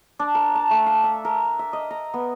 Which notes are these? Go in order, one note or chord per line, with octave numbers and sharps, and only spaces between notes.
D4
A#4
A5
A3
F5
E5
A#4
E5
D#5
A#5
B3